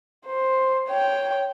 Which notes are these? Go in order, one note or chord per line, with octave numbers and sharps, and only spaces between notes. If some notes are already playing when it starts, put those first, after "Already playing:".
C5
C#5 G5